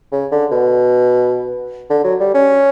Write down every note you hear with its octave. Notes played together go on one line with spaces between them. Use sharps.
C#3
D3
B2
D3
F#3
G3
C#4